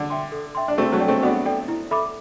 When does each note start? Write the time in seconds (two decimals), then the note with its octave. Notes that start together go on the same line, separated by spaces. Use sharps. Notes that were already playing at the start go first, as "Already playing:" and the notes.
Already playing: D3
0.10 E5 G5 C6
0.32 A4
0.55 E5 G5 C6
0.68 D4
0.78 A3 C4 F#4
0.92 F#3 A3
1.00 A4 D5 G5
1.08 A3 C4
1.22 B3 D4 F#4
1.46 A4 D5 G5
1.68 E4
1.91 A4 E5 B5 D6